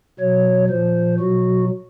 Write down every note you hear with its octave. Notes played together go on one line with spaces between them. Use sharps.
B2 F#3 C#5
A#2 F3 C5
B2 F#3 F#4